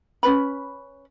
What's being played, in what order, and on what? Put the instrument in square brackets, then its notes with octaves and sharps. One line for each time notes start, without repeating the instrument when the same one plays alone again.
[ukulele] C#4 D4 B4 B5